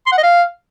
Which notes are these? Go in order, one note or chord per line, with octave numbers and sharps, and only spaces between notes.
C6
F#5
D#5
F5